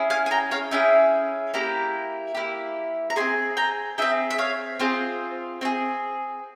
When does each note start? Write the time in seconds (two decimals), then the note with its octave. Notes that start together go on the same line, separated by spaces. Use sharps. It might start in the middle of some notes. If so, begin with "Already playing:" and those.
Already playing: C#4 E4 G#4
0.10 F5 G#5
0.26 G#5
0.31 G5 A#5
0.51 C#5 F5
0.71 C#4 E4 G#4 E5 G5
1.54 A#3 E4 G4 G5 A#5
2.35 A#3 E4 G4
3.10 A#5
3.16 C4 E4 G#4 G#5 C6
3.57 G5 A#5
3.98 E4 G#4 E5 G5
4.02 C4
4.31 E5
4.38 C#5 F5
4.79 C4 F4 G#4 C5
5.61 C4 F4 G#4